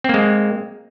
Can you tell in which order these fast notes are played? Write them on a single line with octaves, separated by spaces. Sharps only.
C4 A#3 G#3